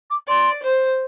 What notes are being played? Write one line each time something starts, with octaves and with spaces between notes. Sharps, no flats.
D6
D5 C6
C5